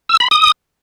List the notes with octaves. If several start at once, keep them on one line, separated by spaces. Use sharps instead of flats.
E6
B5
D#6